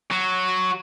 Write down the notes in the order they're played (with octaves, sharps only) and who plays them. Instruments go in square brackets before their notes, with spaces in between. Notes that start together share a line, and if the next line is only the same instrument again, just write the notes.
[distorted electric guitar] F#3 F#4